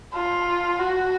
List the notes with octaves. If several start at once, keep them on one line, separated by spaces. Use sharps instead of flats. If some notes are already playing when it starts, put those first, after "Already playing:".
F4
F#4